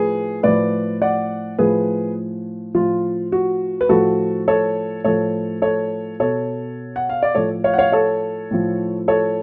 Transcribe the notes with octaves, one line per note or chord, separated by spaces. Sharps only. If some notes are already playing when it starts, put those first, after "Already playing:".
Already playing: A2 F3 G#4 B4
A2 F3 B4 D5
D5 F#5
A2 F3 G#4 B4
A2 F3 F4
F#4
B4
A2 F3 F#4 A4
A4 C#5
A2 F3 A4 C#5
A4 C#5
B2 A4 C#5
F#5
F5
D5
A2 F3 A4 C#5
C#5 F5
F#5
C#5 F5
A4 C#5
A2 F3
A4 C#5